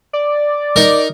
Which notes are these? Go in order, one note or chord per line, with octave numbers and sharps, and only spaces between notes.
D5
D#4 A#4